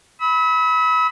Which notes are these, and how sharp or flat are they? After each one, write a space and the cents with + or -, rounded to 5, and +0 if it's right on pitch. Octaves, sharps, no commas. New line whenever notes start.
B5 +0 E6 -40